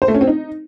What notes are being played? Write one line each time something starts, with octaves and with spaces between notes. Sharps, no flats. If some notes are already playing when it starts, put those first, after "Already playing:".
C5
A3
C#4
C4
D#4